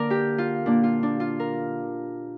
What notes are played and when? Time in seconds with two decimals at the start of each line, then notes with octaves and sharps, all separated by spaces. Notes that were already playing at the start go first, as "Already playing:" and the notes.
Already playing: D3 A#3 A#4 D5
0.10 G4
0.38 F4
0.66 A#2 A#3 D4
0.83 F4
1.03 D4
1.20 F4
1.40 A#4